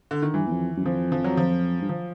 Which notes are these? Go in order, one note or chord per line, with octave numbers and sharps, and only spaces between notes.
D3
D#3
G2 E3
E2
F2
F#2
F2 F3
F3
F#3
F3
G2
F3